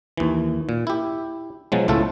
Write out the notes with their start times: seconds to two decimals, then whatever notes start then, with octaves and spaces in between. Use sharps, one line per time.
0.17 D#2 E3
0.69 A#2
0.87 E4 G4
1.72 B2 F3 F#3 G#3
1.88 C#2 A2 A3 F4 A4